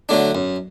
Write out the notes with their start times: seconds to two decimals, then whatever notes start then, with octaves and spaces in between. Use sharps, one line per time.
0.09 D3 F#3 A3 D4
0.35 F#2